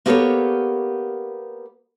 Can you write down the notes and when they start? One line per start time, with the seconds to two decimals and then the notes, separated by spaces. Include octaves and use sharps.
0.06 A#3 B3 G4 A4 A#4 C#5